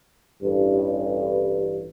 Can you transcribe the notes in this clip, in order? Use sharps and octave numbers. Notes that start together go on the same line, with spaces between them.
A1 G2